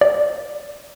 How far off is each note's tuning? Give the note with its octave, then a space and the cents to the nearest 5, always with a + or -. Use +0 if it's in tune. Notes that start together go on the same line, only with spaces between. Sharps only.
D5 +10